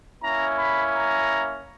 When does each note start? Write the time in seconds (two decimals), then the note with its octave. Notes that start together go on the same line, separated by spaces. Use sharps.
0.22 A#3 C#4 E4 A#5
0.57 B5
0.93 A#5